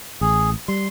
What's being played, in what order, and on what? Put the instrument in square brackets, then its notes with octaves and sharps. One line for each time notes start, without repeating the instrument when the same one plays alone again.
[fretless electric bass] A1 [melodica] G#4
[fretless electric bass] G3 [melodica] C6